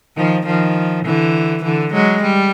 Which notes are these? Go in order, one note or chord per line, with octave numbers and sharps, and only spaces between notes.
D#3 F3
D#3 F3
D3 E3
D3 E3
F#3 G#3
G3